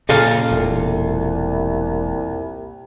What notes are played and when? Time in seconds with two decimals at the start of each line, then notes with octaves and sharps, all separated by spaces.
0.09 A#2 C#3 A4 F5
0.51 E1 C2